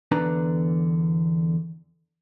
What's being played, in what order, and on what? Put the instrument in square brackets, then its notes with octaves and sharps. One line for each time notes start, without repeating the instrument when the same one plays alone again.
[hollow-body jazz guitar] E2 D3 D4 B4 A#5